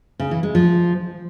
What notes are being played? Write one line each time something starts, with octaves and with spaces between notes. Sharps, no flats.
C#3
E3
G#3
F3